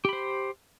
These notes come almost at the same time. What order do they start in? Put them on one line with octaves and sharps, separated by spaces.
G4 B5 C5